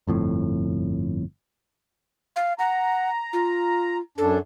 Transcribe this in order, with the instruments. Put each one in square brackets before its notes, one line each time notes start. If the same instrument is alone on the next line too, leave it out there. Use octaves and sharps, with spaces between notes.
[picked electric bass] G1 F2 A2
[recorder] F5
[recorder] F#5 [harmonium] A#5
[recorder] F4
[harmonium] F#2 D4 [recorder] A4